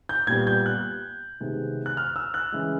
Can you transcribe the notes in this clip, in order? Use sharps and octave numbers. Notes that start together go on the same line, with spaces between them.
G6
A#2 G3 B3 G#6
G6
F#6
C3 D#3 G#3 B3
F#6
F6
E6
F#6
C#3 E3 G#3